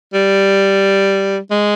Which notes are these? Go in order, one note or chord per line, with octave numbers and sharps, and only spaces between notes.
G3
G#3